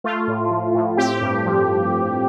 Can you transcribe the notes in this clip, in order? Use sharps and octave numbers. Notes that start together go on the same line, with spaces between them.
A3 F4
A2
F3
A2
C4 G4
G2
F3